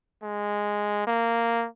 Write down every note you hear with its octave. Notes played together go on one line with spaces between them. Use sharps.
G#3
A#3